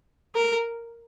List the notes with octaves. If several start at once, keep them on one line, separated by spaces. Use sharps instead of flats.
A#4